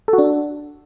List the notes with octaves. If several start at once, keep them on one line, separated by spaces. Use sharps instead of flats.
A4
F#4
D4